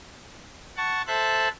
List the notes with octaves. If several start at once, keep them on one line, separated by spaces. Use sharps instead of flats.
F#5 A5 C#6
A4 C5 E5 A5 F#6